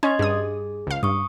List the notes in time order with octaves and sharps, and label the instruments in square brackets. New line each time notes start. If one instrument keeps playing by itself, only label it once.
[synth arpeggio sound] C#4 [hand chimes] D#5 C6 G#6
[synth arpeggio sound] G2 D#6 [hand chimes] G#4
[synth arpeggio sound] C#2 F5
[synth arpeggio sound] G2 [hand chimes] C#6 D#6